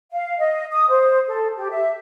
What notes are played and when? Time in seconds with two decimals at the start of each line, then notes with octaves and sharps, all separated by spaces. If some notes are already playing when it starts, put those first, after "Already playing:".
0.11 F5
0.38 D#5
0.72 D#6
0.89 C5
1.27 A4
1.57 G4
1.71 E5